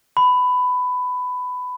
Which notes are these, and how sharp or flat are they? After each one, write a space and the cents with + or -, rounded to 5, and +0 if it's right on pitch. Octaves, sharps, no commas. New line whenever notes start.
B5 +15